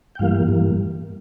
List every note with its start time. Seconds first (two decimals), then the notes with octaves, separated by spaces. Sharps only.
0.15 G5
0.19 G2 E3 G3 A#3 F5
0.48 G2 E3 G3 A#3